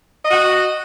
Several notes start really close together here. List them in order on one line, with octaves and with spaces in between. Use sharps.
D#5 F#4 F#5